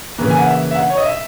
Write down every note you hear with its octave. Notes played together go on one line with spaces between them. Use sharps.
C#3 E3 A#3
G#5
F#5
E5
E5
F#5
C#5
D#5
E5